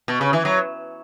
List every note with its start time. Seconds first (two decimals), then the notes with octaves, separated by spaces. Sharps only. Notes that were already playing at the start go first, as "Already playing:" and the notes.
0.08 B2
0.21 C#3
0.33 E3
0.45 F#3